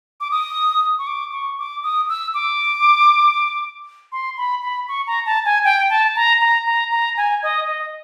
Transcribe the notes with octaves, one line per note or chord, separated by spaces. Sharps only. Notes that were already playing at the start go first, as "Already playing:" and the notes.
D6
D#6
C#6
D6
C#6
D6
D#6
E6
D6
C6
B5
B5
C#6
A#5
A5
G#5
G5
A5
A#5
A#5
A#5
A#5
G#5
D#5
D#5